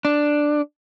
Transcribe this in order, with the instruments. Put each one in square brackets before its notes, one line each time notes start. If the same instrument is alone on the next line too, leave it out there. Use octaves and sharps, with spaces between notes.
[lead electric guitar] D4